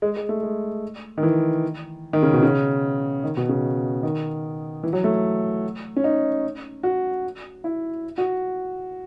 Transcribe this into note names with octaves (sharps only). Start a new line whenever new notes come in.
G#3
G#3
A3
G#3
D#3
E3
D#3
C#3
B2
C#3
D#3
B2
C#3
D#3
E3
F#3
A3
C#4
D#4
F#4
E4
F#4